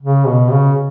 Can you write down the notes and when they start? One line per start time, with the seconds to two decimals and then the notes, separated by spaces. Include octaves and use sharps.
0.02 C#3
0.26 B2
0.51 C#3